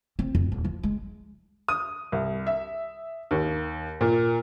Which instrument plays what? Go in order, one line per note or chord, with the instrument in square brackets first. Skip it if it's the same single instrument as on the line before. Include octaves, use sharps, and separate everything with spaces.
[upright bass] C4
F2
D#1
F3
G#3
[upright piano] D#6
C2
E5
D#2
A#2